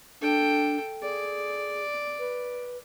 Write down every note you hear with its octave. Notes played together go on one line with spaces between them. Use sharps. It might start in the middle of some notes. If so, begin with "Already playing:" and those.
D4 A4 G5
G#4 D5
B4